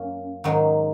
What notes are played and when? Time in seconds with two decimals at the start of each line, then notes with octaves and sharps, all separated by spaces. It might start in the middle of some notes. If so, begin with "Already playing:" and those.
Already playing: F#2 A#3 C#4
0.44 G#2 D#3 F#3